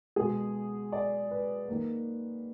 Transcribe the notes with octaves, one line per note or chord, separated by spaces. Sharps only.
B2 G#3 G#4
D5
B4
D#3 A#3